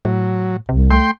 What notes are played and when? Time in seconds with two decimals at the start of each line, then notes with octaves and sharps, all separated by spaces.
0.05 A2 F#3
0.69 C2 C3
0.90 A3 G5 C6